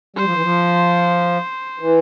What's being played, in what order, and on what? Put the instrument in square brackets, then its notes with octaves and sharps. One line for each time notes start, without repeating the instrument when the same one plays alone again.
[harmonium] G3 [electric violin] C5
[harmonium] F3
E3
F3
E3